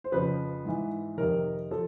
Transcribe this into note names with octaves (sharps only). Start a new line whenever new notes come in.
C5
F2 C#3 F3 B4
G#2 E3
F2 C3 D#3 A#4
F3 A4